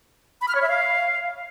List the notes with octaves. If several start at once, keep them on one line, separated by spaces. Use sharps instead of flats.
B5
F6
C#5
E5
F5